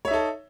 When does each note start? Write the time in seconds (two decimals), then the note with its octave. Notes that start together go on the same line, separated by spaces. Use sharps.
0.05 C#5
0.08 E5
0.11 D#4
0.13 A4